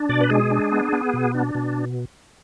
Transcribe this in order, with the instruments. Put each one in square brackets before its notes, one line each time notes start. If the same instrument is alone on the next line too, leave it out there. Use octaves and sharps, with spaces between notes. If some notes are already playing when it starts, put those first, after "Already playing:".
Already playing: [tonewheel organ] D4
B2 D5
B4
G#3 G#4
D4
B3
B3
B2
D4
B2